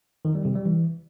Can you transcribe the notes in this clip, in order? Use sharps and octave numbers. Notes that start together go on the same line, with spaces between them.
D#3
G3
C3
G3
E3